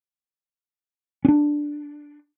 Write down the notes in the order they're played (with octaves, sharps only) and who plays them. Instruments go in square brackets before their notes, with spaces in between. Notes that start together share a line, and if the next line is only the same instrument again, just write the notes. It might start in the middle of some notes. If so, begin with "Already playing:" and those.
[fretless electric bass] C#4 D4